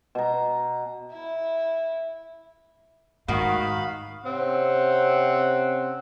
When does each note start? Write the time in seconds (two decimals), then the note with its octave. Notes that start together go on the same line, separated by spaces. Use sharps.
0.15 B2 A#5
1.11 E4 E5
3.28 G#2 D#3 F#4 F5 B5
4.24 C3 C4 C#4 F#5